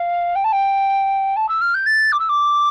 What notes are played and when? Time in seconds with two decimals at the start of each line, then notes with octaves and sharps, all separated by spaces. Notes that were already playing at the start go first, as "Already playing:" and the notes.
Already playing: F5
0.36 G5
0.44 A5
0.53 G5
1.36 A5
1.49 E6
1.61 F6
1.74 G6
1.86 A6
2.12 D6
2.20 E6
2.29 D6